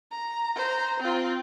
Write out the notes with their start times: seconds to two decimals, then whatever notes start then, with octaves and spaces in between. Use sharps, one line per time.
0.11 A#5
0.56 C5 A#5
1.00 C4 F4